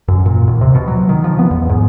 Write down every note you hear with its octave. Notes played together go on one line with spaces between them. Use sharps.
F#2
A#2
D#2
C3
B2
F#3
D#3
F3
B3
E2
G#2